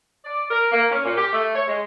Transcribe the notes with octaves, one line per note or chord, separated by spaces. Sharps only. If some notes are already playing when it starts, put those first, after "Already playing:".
D5
A#4
A#3
C#4
A#2
G4
A3
C#5
G#3